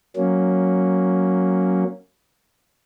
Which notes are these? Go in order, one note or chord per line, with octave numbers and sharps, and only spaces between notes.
F#3 A#3 C#4